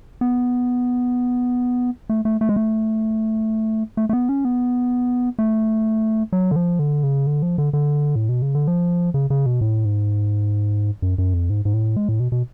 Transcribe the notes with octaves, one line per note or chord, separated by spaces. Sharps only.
B3
A3
A3
A3
G#3
A3
A3
A3
B3
C#4
B3
A3
F#3
D3
F3
D3
C#3
D3
F3
D3
D3
A2
B2
C#3
D3
F3
C#3
C#3
B2
A2
G#2
F#2
F#2
F2
G#2
G#2
A2
G#3
A2
B2
B2